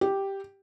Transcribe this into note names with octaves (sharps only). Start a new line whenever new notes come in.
G4